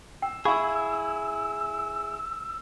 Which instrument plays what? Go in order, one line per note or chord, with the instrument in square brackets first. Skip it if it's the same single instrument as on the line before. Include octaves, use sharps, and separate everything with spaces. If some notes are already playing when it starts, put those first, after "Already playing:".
[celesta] G5 [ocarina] E6
[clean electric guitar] E4 G#4 [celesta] F5 B5 C#6